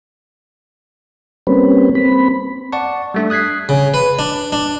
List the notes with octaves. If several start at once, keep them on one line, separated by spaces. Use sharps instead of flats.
G3 A#3 C4 C#4 B4
C4 B5
D5 F#5 A5 C#6
G3 A3 D4
D#6 F#6 G#6 B6 C7
C#3
B4
D4
D4